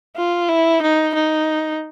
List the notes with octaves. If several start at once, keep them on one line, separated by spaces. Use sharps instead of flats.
F4
E4
D#4
D#4